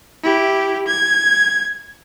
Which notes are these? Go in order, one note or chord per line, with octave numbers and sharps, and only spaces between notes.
E4 G4
G#6